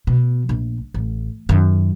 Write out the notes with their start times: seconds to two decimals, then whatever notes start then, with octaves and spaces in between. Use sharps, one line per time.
0.07 B2
0.49 A#1
0.94 A1
1.49 F#2 D#3